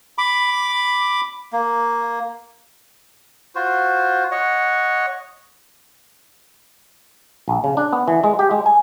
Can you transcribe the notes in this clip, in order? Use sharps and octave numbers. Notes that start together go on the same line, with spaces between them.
B5 D6
A#3
F4 F#4 C5
C#5 D#5 F#5
A#1
C#3
D4
B3
E3
G#3
G4
G#3
G#5